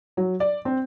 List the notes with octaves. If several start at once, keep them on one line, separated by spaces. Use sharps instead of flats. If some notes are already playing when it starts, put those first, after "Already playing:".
F#3
D5
C4